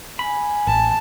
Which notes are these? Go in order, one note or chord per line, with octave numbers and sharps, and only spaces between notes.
G#5 B5
A1 A5